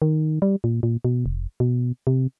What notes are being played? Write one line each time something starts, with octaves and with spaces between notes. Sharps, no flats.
D#3
G3
A#2
A#2
B2
F1
B2
C3